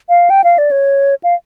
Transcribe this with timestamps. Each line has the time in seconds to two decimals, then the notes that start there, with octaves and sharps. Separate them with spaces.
0.09 F5
0.30 G5
0.44 F5
0.58 D5
0.71 C#5
1.24 F5